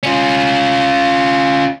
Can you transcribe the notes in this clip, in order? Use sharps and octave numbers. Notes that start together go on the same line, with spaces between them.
C#4 F4